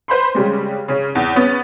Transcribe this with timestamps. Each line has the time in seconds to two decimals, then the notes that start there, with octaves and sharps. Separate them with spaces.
0.08 B4 C5 B5 C6
0.35 C#3 G3 G#3
0.88 C#3 C#4
1.15 E2
1.35 B3 C#4